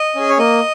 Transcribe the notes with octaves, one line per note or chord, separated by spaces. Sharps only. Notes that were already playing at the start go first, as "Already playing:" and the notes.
Already playing: D#5
C#4 G#4
C#5
A#3 D#5